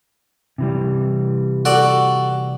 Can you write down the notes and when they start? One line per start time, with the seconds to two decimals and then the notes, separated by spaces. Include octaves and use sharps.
0.58 C3 E3 G3
1.65 F#4 A4 D5